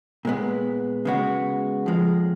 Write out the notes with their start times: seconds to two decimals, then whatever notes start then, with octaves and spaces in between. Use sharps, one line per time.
0.25 A#2 G#3 B3
1.05 C#3 G#3 B3 F#4
1.86 F2 F3 G#3